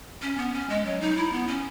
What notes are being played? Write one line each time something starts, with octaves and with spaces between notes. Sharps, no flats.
C#4
B3
C#4
G#3
F#3
D#4
E4
B3
C#4